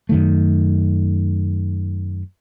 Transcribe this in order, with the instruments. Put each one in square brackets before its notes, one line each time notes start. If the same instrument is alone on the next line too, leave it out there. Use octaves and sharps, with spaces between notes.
[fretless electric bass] F#2 D#3 A3